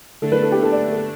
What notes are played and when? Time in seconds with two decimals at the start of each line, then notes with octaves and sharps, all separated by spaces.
0.22 D3 A3 D4 A4
0.32 B4
0.43 A4
0.52 G4
0.63 A4
0.72 D5
0.92 A4